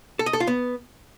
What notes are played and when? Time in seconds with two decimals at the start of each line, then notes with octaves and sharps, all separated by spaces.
0.19 A4
0.26 D#5
0.33 A4
0.40 F4
0.47 B3